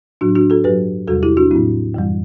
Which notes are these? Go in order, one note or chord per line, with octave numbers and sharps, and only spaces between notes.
A2 F#3 D4 F#4
D4 F#4
F#4 A4
G2 F#3 G4 B4
E2 C3 G3 F#4 A4
E4 G4
D4 F#4
A2 F#3 C4 E4
F#2 E3 G3